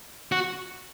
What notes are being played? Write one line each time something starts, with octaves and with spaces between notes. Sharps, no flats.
F#4